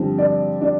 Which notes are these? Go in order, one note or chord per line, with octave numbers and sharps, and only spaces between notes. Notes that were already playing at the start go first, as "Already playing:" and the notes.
Already playing: G2 D3 F3 C4
D4 D5
D4 D5